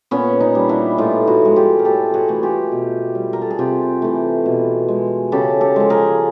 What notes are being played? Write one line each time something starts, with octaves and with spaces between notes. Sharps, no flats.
A#2 B3 C#4
C#4 D#4
G3
D4 E4
A2 D#4 F4
E4 F#4
F3 G#3
F4 G4
A#4
A2 G4 A4
F#4 G#4
E3 A3
F4 G4
B2
G3
A#4
A4
G#4
C3 F4 G4
E3 A3
B2
G#3
C#3 G4 A4
G4 A4
F3 G#3
G#4 A#4